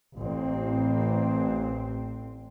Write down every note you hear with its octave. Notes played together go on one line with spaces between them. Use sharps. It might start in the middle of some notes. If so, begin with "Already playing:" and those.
A1 C4